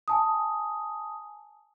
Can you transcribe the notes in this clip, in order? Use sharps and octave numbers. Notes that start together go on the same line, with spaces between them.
G#5 A5 D#6